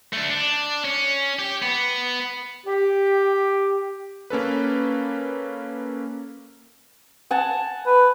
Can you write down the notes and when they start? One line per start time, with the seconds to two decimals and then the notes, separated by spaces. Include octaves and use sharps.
0.13 A3 D4
0.30 D4
0.84 C#4
1.39 G4
1.62 B3
2.66 G4
4.30 A#3 C#4 A4 B4
7.31 F#5 G#5 A5
7.86 B4